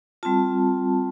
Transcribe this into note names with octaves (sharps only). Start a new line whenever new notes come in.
G3 C4 F4 A5